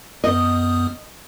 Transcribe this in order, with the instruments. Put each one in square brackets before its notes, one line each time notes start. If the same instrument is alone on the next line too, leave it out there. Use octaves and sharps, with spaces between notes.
[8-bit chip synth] F#2 B3 D#6 [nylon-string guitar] D#5